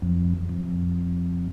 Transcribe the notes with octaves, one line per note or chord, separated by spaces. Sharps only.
F2
F2